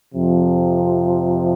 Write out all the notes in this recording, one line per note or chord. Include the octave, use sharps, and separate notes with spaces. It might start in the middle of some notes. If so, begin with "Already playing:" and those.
F2 C3 F3